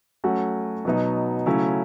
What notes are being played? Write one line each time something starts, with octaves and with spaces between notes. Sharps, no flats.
F#3 A3 C#4 F#4
B2 F#3 B3 D#4
C#3 F#3 A3 C#4 E4